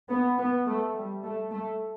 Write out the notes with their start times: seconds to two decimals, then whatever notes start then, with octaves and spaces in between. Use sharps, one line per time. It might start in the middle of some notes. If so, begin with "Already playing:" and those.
0.09 B3
0.37 B3
0.66 A3
0.95 G3
1.24 A3
1.51 A3